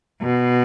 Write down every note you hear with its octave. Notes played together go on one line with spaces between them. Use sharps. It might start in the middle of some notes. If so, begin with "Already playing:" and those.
B2